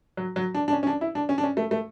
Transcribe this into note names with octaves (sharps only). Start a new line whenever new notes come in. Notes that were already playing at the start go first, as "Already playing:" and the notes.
F#3
F#3
D4
D4
C#4
C#4
D4
E4
D4
C#4
D4
C#4
A3
A3